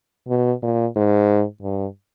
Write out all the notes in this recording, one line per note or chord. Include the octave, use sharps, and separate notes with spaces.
B2
A#2
G#2
G2